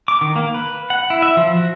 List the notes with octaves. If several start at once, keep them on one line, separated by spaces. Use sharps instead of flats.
D6
D#3
A#3
B4
F#5
E4
E5
F3
F#4